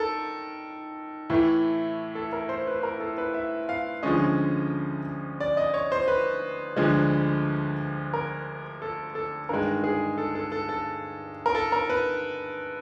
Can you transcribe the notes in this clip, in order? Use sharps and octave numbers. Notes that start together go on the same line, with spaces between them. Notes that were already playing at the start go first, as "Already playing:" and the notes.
Already playing: D#3 A4 A#4
A2 E3 A3
A4
A#4
C5
B4
A#4
A4
B4
E5
F5
D2 D3 F3 G#3 C#4 D#5
D5
D#5
C#5
C5
B4
D2 D3 F3 G#3
A#4
A4
A4
G2 D#3 G#3 A#4
G#4
A4
A4
A4
A4
A#4
A4
A#4
B4